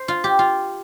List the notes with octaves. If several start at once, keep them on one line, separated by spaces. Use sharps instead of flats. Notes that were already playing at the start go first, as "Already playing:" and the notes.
Already playing: C5
F4
G4
F4